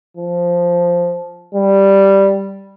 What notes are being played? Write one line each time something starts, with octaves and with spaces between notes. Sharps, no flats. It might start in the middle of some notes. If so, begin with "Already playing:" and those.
F3
G3